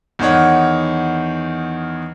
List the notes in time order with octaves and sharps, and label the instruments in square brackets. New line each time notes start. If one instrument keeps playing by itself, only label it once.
[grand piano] E2 D#3 D#4 C#5 F#5